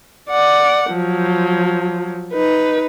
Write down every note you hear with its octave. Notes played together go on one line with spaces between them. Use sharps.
D5 F#5
F3 F#3
D#4 B4